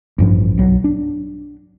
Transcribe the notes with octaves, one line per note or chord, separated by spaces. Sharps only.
A1 G2 F3
B1 F#3
D4